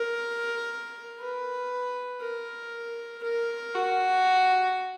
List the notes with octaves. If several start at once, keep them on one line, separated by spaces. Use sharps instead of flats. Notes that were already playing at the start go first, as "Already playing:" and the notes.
Already playing: A#4
B4
A#4
A#4
F#4